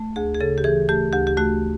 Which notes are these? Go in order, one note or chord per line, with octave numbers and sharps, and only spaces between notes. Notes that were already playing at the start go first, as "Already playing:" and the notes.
Already playing: A3
D2 G#4
G#4
C#3 A4
G4
E3 G#4
A3 G4
D2 G4
G4
A3 F#4